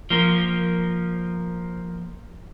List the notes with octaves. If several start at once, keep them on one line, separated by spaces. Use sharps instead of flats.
F3 A#3